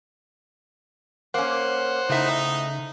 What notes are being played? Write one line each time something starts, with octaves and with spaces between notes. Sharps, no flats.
A#3 C#4 C5 F#5
A2 C#3 D#4 E5